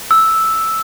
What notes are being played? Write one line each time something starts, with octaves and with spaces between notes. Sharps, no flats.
E6